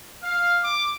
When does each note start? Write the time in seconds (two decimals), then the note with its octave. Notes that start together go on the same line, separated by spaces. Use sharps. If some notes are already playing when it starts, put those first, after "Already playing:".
0.23 F5
0.62 D6